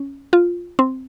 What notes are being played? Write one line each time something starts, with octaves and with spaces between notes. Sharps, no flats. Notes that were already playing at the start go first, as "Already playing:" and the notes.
Already playing: C#4
F4
C4